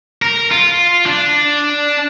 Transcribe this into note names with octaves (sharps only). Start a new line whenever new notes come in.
A#4
F4
D4